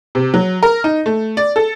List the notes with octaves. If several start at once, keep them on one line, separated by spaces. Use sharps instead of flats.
C3
F#3
A#4
D#4
A3
D5
A4